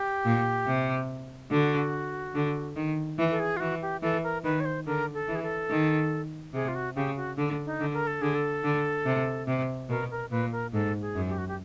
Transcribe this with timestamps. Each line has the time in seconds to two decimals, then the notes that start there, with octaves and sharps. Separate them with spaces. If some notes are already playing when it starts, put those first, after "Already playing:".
Already playing: G4
0.25 A#2
0.67 C3
1.51 D3 F#4
2.35 D3
2.76 D#3
3.19 E3
3.31 A4
3.40 G#4
3.57 F4
3.60 E3 F#4
3.82 G4
4.02 E3 A4
4.24 A#4
4.44 D#3 B4
4.60 C#5
4.65 C5
4.86 D3 A#4
5.14 A4
5.28 E3
5.35 G#4
5.43 A4
5.70 D#3
6.53 C3 G#4
6.68 F4
6.75 F#4
6.96 C#3 G4
7.16 F#4
7.38 D3
7.66 D#4
7.80 D3
7.94 A#4
8.07 A4
8.22 D3 G#4
8.35 A4
8.64 D3
9.06 C3
9.47 C3
9.89 B2 A#4
10.11 A#4
10.31 A#2 B4
10.52 A#4
10.74 G#2 A4
11.02 G#4
11.15 F#2
11.29 G4
11.38 F#4
11.48 G4